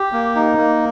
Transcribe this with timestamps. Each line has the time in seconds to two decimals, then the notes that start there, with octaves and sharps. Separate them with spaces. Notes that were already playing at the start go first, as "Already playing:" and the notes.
Already playing: G4
0.12 A#3
0.35 D#4
0.58 A#3